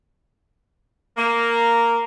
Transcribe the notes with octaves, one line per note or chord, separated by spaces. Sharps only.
A#3